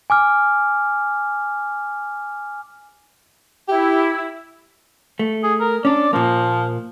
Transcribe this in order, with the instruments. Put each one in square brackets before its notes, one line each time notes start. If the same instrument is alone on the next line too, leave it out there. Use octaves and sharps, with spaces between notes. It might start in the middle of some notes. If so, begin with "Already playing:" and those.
[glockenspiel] G#5 D6 F6
[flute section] E4 [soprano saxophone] G4
[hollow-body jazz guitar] A3
[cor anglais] G#4
A#4
[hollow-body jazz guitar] C#4 D4 [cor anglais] D5
[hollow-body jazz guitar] A#2 A#3 [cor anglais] F3